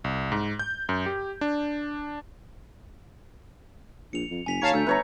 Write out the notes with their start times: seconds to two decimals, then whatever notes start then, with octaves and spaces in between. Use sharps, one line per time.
0.04 C2
0.32 G#2
0.59 G6
0.89 F#2
1.06 G4
1.41 D4
4.13 A#1 C#7 F7
4.31 F2
4.46 F#1 G#5 B6 F7
4.62 D#2 C#5 F5 A5 A#5 C#7
4.74 D2 A3 E6 G6
4.87 G1 B4 C#5 A#5